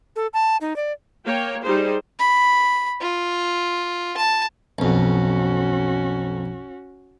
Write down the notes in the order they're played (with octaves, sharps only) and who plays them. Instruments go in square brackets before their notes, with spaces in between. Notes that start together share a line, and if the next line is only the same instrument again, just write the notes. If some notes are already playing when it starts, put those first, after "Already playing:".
[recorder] A4
A5
D#4
D5
[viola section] A#3 C#5 G5
G3 D#4 G#4 C5
[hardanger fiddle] B5
F4
A5
[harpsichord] B1 F2 [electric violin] C#4 F#4